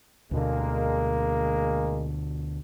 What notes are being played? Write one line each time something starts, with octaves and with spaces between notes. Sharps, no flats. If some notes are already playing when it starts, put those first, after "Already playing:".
D2 B2 D3 G#3 A#3